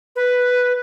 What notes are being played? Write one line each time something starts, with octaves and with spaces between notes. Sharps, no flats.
B4